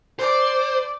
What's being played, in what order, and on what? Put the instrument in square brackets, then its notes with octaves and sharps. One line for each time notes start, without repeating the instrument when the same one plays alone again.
[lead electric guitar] C5 [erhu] D5